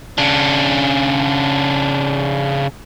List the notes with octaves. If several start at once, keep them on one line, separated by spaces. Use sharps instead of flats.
C#3 D4